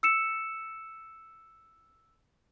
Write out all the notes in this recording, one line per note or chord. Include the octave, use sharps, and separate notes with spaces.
E6 C#7 E7